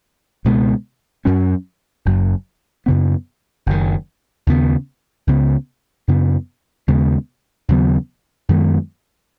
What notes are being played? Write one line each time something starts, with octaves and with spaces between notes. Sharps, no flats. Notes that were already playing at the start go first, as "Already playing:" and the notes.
C#2 B2 G#3 B3
F#2 F#3 C#4
F#1 F#2 F#3
F#2 C#3 B3
F#1 F#2 D#3
D#2 C#3 B3
C#2 C#3 B3
F#2 C#3 B3
D#2 C#3 G#3 B3
D#2 C#3 F#3 B3
F#2 D#3 G#3 B3